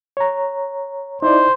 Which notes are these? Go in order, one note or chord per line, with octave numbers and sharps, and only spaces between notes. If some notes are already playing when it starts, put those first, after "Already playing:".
C#5 A#5
D#4 E4 C5 D5